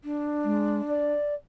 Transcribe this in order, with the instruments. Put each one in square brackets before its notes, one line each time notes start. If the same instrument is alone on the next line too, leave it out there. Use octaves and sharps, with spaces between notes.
[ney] D4
[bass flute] G#3
D5